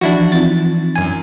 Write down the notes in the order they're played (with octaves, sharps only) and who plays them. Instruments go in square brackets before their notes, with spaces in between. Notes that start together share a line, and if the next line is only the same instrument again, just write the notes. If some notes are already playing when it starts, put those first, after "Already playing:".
[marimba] E3 F3 [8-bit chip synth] D4 E4 F#4
[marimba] C4 D#4 F4 [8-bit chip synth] A6
[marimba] E3
[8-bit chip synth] F#2 G#5